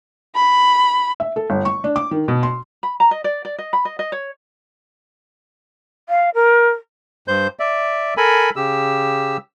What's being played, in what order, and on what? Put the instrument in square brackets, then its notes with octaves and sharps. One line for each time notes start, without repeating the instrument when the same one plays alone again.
[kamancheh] B5
[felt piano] E5
A4
G1
C#6
D4
D6
D#3
B2
C6
[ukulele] B5
A#5
D#5
D5
D5
D#5
B5
D#5
D#5
C#5
[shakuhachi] F5
A#4
[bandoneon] G2 C5 G6
D5 E5
A4 A#4 G#5 B5
C#3 G4 E6